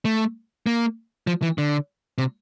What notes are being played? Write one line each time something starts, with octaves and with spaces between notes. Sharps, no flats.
A3
A#3
F3
E3
D3
C3